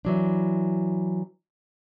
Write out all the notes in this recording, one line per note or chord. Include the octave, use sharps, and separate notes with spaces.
E3 F#3 D4